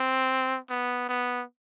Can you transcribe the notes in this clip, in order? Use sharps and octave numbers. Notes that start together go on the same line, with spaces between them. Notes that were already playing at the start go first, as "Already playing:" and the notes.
Already playing: C4
B3
B3